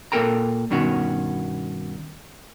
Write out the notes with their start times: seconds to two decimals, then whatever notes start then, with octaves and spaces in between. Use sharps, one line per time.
0.12 A#2 A#3 A4 A#4 G5 A#5
0.71 G2 B2 D#3 C#4 F#4